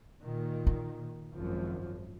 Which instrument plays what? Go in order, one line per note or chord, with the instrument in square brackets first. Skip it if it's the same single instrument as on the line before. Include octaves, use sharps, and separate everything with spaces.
[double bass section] A#2 D#3
[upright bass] D#4
[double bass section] G#1 F#2 F3